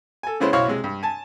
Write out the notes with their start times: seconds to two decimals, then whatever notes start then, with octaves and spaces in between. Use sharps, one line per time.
0.23 A4 G#5
0.40 C#3 G#3 B3 C#4 E4 C5
0.53 B1 E4 C5 C#5 F5 C#6
0.68 C3 G#3
0.84 G2
1.03 G#5 A5